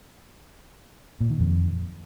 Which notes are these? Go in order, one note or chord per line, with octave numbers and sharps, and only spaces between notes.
A#2
D#3
F2